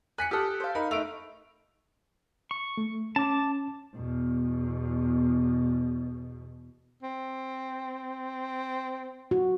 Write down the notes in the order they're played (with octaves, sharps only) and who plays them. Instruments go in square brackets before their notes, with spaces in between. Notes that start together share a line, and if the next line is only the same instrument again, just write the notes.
[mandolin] G#5 [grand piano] F#6 B6 C#7
[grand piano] G4 A4 [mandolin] D#6 F6
[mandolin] C5 F5
[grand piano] D#4 A#4 B5
[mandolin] A3 [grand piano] D#4 D7 F7
[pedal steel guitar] C#6
[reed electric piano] A3
[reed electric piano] C#4 [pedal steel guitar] A5 D6
[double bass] E2 B2
[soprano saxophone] C4
[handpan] F#4